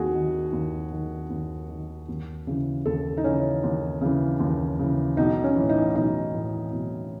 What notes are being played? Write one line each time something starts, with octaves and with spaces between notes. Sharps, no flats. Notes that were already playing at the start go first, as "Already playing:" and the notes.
Already playing: D#2 D#3 F#4 G#4
D#3
D#2
D#3
D#2
D#3
D#2
C#3 E3
D#2 A4
D#4
C#3 E3 C#4
D#2
C#3 E3
D#2
C#3 E3
B1 D#4
C#4
A2 E3
D#4
B1 D#4
A2 E3
B1